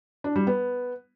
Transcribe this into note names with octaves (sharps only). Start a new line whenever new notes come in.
D4
G3
B3